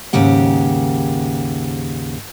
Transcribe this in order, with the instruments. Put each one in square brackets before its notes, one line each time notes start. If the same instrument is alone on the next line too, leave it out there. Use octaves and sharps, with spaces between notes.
[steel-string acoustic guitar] D#2 G#2 C#3 G4 F#5